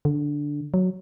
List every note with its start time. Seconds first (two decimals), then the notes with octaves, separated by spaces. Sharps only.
0.05 D3
0.74 F#3